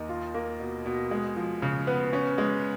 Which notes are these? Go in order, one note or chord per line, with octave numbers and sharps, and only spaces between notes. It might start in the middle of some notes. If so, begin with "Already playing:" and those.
Already playing: D#2 D#4
F4
A#3
B2
B2
G#3
F3
C#3
B3
C#4
G#3